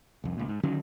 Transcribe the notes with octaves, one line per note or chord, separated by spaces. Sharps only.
C2 F2
C#2 A#2
G#2
D3 D#3 F#3 C#4